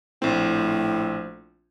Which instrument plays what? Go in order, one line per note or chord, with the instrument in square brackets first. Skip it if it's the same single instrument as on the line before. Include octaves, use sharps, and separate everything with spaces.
[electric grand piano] A#1 C4 [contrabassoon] A2